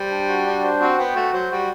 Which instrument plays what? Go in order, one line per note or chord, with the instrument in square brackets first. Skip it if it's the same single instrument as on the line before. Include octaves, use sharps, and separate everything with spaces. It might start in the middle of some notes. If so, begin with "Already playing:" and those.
Already playing: [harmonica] G3 [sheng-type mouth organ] C5
[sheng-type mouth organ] D4
F#4
D4
C5
[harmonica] C4 [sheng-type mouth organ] F#4
[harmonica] B3 [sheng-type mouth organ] G5
[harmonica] A3 [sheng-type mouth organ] F#4
[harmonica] F#3 [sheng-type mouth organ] C5
[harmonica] G3 [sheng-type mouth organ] F#4